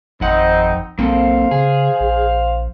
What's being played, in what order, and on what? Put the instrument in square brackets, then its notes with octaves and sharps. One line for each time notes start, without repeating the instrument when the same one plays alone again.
[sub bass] G#1 [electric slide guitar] F2 F#5 [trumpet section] C4 D#4
[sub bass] B1 [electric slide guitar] A#3 C4 A4 [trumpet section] C5 F5
[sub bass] C#3 [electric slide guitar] G#4
[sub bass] A#1